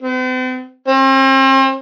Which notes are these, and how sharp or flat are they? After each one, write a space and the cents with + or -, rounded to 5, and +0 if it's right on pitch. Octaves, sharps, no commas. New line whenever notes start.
C4 -45
C4 +40